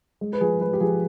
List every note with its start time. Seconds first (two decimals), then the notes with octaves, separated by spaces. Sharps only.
0.21 G#3
0.33 B4
0.41 F3 G#4
0.60 G#3 B4
0.73 G4
0.80 F3 G#4